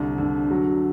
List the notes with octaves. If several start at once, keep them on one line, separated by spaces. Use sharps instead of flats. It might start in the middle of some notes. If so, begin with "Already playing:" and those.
Already playing: C2 D3
D3
F#3